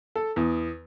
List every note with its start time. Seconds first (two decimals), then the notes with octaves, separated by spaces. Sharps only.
0.16 A4
0.36 E2